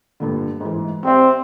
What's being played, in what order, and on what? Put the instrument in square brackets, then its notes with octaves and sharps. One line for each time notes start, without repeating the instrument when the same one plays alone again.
[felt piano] G2 A#2 D3
G#2 E3
[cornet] C4 [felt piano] G4 D5 E5